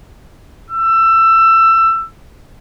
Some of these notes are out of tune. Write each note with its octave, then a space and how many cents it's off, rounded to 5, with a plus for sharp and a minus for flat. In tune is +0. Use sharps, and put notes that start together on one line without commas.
E6 +20